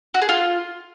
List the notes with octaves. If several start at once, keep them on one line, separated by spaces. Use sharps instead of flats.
F#4
G#4
F4